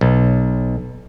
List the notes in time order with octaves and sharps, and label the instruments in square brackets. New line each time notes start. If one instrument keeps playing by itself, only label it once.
[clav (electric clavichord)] B1